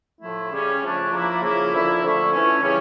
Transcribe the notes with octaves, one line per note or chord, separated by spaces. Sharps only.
A2 F3 A3 E4
C#3 G3 C#4
C#3 F3 A3 D4
F3 A#3 E4
C#3 F3 A#3 C#4 E4
D3 F3 A#3 E4
D3 F3 A3 C#4 E4
E3 A3 C#4
C#3 E3 G3 C#4